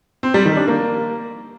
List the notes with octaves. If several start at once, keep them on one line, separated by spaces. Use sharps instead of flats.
C4
G3
D#3
D4
A#3